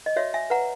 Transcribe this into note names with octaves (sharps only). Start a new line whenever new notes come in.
D#5
F#4 C#5 E5
E5 G#5
B4 F#5 A#5